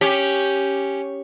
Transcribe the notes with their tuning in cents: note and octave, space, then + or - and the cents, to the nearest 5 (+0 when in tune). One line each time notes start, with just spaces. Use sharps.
C#4 +0 G4 +0